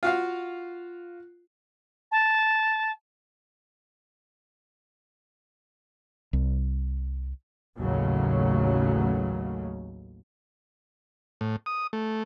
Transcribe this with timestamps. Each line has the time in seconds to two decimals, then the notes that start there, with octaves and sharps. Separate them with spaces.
0.03 F4 F#4 F5
2.12 A5
6.33 C2
7.79 A1 D#2 C#3 F#3 A3
11.41 A2
11.66 D#6
11.93 A3